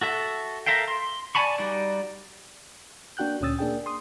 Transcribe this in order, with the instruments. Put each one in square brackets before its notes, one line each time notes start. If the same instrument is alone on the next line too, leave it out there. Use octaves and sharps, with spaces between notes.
[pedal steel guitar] F#4 A4 E5
A4 A#4 E5 F5 G5
C6
D5 G#5 A5 B5 C#6
G3 D#4 F#4 D5
[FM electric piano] A#3 D4 F#4 G5 F#6 G6
D2 A#2 C#4 D#6 E6 A6
A#3 D4 G#4 G5
C6 D#6